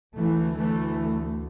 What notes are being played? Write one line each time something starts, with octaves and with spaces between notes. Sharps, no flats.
D2 E3 A3
E3 A3